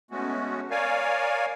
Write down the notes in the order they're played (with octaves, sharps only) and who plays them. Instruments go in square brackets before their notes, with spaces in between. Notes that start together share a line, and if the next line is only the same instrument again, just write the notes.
[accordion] G#3 A3 B3 C#4 F#4
A#4 C#5 D5 F5 G#5